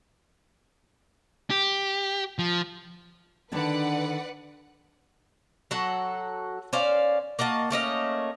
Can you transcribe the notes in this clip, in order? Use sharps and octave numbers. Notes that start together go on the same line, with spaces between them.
G4
F3
D3 D#3 D4 B4 D5 F#5
F#3 F#4 A4 F#5
C#4 C5 D5 F5
A#3 F#4 D#5 A5
A3 A#3 C#4 D#5